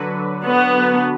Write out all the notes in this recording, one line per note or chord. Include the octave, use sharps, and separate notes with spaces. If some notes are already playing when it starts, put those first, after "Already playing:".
Already playing: D3 F#3 D4 F#4 B4
B3